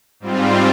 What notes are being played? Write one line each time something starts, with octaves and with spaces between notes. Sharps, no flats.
G#2 G3 C4 F4